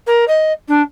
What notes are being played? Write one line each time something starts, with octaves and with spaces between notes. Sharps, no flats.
A#4
D#5
D4